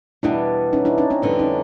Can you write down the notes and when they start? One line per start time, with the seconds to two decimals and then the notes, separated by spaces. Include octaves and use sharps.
0.23 E2 B2 G3 B3 D4 E4
0.73 C#4 D#4
0.85 D4 E4
0.98 C#4 D#4
1.10 C4 D4
1.22 F2 D3 G3 B3 C4 D4
1.39 C#4 D#4